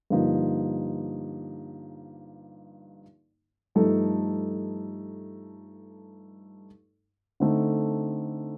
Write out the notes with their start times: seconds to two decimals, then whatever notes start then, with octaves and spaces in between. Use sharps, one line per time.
0.10 G2 D3 F3 A#3 D#4
3.75 G2 F3 A3 D#4 A4
7.40 D3 A3 C4 D#4 A4